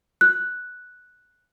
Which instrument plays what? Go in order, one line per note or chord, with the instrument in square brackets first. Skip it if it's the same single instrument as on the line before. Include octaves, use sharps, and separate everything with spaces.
[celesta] F#6